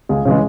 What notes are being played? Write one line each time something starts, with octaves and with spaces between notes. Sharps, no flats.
C#2 G#4
C#3 E3 G#3